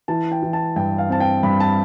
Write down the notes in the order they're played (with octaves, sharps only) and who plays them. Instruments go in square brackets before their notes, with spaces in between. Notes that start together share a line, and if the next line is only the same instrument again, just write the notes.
[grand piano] E3 A5
G5
E3
A5
G2 G5
F5
C4 A5
G5
G2 B5
A5